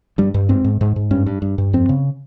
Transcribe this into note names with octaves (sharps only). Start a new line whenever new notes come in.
G2 G3
G2
G#2 C4
G#2
G#2
G#2
G2 C#4
G2
G2
G2
F2 C4
C#3